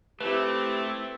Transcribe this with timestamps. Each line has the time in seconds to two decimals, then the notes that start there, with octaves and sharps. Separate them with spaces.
0.21 A3 C4 E4 G4 B4